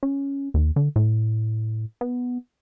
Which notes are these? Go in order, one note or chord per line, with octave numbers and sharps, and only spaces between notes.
C#4
D#2
D3
A2
B3